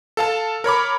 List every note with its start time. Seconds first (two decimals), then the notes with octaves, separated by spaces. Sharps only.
0.17 A4 F5 A5
0.64 A#4 C#5 B5 D6